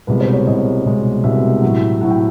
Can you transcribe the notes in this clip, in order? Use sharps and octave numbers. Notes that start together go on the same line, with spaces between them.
C2 B2 G#3 B4
C5
C#5
C2 B2 G#3 D#5
C2 B2 G#3
C2 B2 G#3 E5
A2 F#3
A2 F#3 F#5
G5